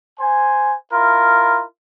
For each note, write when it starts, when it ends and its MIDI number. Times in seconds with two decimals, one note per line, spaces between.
0.20 0.75 72
0.20 0.75 80
0.93 1.63 64
0.93 1.63 65
0.93 1.63 70